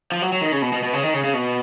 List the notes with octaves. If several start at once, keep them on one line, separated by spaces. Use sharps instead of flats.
F3
F#3
F#3
D#3
C#3
B2
B2
B2
C#3
D#3
C#3
C#3
B2